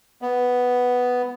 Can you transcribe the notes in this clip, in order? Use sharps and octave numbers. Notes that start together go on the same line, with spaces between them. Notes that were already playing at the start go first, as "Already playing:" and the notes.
B3